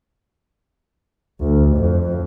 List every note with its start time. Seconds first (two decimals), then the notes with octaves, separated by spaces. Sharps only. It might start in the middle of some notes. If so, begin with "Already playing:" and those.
1.41 D2
1.76 F2